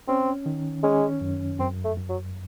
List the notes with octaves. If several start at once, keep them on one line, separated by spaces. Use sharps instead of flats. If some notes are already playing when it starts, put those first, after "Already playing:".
C4 C#4
D#3
G#3 C#4
F#2
F#2 C4
A3
F#2
F#3